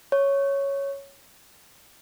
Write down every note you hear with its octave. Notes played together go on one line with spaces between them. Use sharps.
C#5